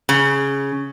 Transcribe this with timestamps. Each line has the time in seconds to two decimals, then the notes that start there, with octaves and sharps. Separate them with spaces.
0.09 C#3